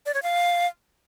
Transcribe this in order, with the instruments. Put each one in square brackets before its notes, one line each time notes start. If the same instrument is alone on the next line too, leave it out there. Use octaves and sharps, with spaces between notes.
[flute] D5
C#5
F5